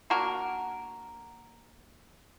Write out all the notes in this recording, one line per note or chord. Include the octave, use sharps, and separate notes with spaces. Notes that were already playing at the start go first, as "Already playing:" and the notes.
A#3 D4 F#4 A#4